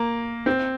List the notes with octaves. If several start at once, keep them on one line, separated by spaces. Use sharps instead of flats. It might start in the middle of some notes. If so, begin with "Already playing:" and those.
Already playing: A#3
C4